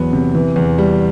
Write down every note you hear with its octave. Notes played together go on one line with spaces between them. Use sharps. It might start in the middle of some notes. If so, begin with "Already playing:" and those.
Already playing: E2 F#3 B3
C3
E3
E2
G3